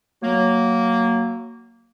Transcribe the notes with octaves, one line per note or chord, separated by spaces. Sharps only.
F#3 A#3